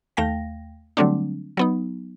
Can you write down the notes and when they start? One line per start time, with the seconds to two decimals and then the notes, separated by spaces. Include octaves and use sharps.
0.17 D#2 A3 F5 G5 A#6
0.97 D3 F#3 G3 A3 C4 D4
1.57 F#3 B3 D#4